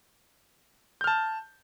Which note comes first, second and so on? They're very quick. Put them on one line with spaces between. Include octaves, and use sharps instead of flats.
G6 F6 A5